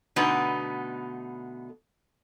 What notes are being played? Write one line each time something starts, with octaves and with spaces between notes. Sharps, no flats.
B2 D3 A3 B3 D#4